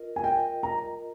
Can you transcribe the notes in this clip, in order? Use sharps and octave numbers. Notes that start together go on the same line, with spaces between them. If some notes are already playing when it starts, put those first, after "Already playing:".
Already playing: F4 A#4 D#5
G#5
F4 A#4 D#5 G5
A#5